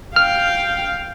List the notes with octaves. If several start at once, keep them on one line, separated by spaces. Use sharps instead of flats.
F5 G5 F6